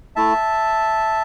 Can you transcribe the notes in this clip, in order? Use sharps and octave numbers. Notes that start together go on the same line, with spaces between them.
A3 E4 E5 A5